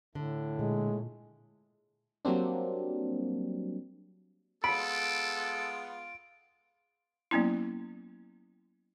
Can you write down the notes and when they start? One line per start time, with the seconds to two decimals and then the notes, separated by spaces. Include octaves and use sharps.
0.15 A2 D3
0.59 A#2 G#3
2.25 F#3 G3 A#3 C4 D4
4.64 G#3 B3 F4 A4 B5 D7
7.31 F#3 A#3 B3 C#4 E4